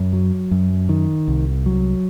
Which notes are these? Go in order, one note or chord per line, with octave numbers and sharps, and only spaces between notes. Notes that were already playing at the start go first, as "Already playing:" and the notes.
Already playing: F#2
F#3
F#2
D#3
C2
F#3